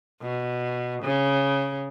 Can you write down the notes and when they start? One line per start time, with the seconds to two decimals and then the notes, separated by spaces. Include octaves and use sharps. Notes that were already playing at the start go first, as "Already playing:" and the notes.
0.21 B2
1.03 C#3